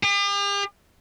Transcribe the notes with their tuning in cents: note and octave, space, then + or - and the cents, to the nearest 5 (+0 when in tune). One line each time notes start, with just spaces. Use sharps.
G4 +45